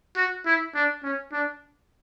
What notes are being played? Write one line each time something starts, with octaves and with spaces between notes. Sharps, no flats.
F#4
E4
D4
C#4
D4